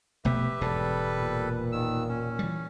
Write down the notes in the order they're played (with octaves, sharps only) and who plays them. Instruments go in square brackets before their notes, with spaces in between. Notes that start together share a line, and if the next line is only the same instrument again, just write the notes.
[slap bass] F1 B2 A3 [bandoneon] G4 B4 E5
[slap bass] E1 G#2 [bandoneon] G3 A4 B4
[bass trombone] A#2
[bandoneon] D#2 D#3 E6
C#4
[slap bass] E3 G3